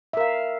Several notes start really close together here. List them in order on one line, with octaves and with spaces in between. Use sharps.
E5 A#4 F5